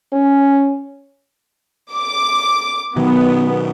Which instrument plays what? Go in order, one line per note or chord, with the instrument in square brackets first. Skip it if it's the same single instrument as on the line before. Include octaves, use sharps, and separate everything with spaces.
[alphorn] C#4
[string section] D6
[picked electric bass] B2 D#3 F#3 [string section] B3